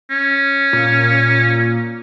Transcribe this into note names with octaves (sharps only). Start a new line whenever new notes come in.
C#4
A#2